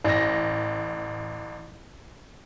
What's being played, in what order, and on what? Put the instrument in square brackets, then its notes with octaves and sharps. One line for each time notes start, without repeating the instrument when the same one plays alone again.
[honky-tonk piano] A1 A#6